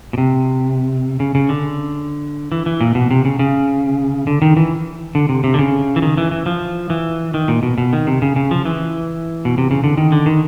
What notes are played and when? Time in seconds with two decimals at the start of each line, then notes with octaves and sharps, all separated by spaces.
0.13 B2
0.18 C3
1.20 C#3
1.35 C#3
1.49 D3
2.52 E3
2.66 E3
2.81 A#2
2.95 B2
3.11 C3
3.25 C#3
3.39 C#3
4.27 D3
4.42 D#3
4.57 E3
5.15 D3
5.29 C3
5.44 C3
5.54 D3
5.59 C#3
5.96 E3
6.02 D#3
6.18 E3
6.31 E3
6.46 F3
6.90 E3
7.34 D#3
7.48 A#2
7.63 B2
7.78 B2
7.93 D#3
8.07 C3
8.22 C#3
8.36 C#3
8.51 F3
8.65 E3
9.45 B2
9.58 C3
9.71 C#3
9.84 D3
9.97 D#3
10.12 D3
10.26 D#3